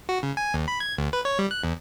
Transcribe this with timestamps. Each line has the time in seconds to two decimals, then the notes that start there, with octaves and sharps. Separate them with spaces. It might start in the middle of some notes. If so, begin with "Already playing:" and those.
0.09 F#4
0.23 C#3
0.37 G#5
0.54 D#2
0.68 B5
0.80 G#6
0.98 D2
1.13 B4
1.25 C#5
1.39 G3
1.51 F#6
1.64 E2